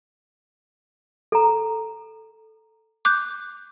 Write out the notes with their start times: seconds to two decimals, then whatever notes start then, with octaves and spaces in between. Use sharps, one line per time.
1.32 A4 A#5
3.05 D6 F#6 G6